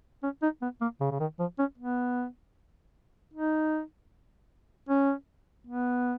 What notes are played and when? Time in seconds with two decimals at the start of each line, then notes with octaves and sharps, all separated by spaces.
0.23 C#4
0.42 D#4
0.62 B3
0.81 A#3
1.01 C#3
1.11 C#3
1.20 D#3
1.39 F3
1.58 C#4
1.78 B3
3.34 D#4
4.89 C#4
5.67 B3